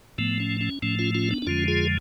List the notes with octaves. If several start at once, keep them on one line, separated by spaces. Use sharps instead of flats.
A2 F3 A3 B3
C#4
C#4
A2 F3 A3 C#4
C#4 F4
C#4 F4
B3 D4
D4
F2 D3 F3 G#3 C#4 F4
F4 G#4